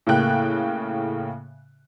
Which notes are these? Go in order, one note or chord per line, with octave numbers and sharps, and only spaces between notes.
A2 C#3 A3 A#3 G5 F#6